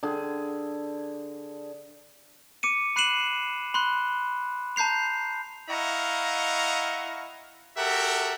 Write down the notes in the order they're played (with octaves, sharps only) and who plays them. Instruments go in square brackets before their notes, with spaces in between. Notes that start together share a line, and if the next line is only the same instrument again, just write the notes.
[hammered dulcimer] D3 G#4
[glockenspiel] D6 C#7 D#7
B5 F#6 C7 D#7 E7 F#7
B5 C6 F#6
A5 A#5 G6 C7 F7
[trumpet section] E4 D#5 F5 F#5 A#5 C#6
F#4 G4 A4 A#4 E5 F#5